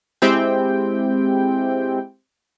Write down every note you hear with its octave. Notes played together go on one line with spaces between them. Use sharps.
G#3 C4 E4 G4 G5